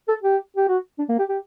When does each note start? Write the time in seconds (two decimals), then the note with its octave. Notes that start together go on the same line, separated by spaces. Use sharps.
0.08 A4
0.23 G4
0.56 G4
0.68 F#4
0.98 D4
1.09 A#3
1.18 G4
1.29 G4